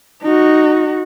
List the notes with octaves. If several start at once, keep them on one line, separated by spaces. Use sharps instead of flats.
D#4 F#4